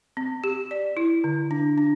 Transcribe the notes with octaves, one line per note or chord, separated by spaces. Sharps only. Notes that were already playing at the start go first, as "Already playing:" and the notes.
C4
G4
D5
E4
D3
D4
D4